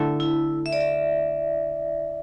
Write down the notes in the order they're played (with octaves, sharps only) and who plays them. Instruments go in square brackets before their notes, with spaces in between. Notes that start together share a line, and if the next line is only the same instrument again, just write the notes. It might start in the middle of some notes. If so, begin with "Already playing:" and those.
Already playing: [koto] D3 A3 A4 [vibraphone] E4
[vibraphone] E4
E5
D5
E5